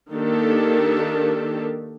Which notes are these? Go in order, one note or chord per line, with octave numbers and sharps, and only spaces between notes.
D#3 A#3 D4 G4 A4